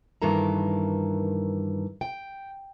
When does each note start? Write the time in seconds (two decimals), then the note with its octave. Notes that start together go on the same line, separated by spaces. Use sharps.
0.22 G2 D#3 E3 A#3 A4 A#5
2.01 G5